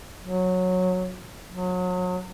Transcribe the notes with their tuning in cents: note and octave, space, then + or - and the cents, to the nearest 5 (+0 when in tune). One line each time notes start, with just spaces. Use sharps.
F#3 -15
F#3 -30